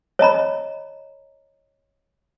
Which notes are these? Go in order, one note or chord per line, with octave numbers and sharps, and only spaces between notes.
C#5 D#5 A#5 B5